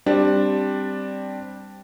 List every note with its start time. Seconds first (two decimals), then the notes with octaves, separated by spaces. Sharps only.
0.06 G3 C4 D4